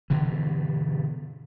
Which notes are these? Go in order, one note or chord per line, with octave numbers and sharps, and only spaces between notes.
G2 B2 D3 E3